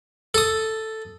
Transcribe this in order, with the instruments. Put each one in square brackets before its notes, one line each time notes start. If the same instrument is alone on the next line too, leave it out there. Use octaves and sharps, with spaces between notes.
[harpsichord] A4 D#6